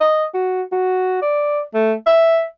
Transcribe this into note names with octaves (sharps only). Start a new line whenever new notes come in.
D#5
F#4
F#4
D5
A3
E5